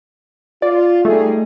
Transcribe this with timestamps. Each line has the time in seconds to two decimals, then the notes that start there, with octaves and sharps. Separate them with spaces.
0.62 F4 D5
1.05 G3 A3 D#4 G#4